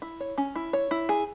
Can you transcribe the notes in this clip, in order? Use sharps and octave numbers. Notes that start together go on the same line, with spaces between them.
E4
C#5
C#4
E4
C#5
E4
G#4